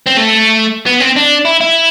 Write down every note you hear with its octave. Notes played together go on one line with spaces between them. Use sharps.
C4
A3
B3
C4
D4
E4
E4